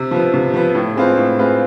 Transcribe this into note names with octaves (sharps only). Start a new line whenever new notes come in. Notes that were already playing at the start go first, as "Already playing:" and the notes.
Already playing: C3
F3 B3
C3
F3 B3
A2
G#3 C4 F4 B4
A2
G#3 C4 F4 B4